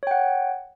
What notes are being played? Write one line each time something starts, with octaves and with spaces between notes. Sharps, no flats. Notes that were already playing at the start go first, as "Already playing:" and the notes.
C#5 F#5 G5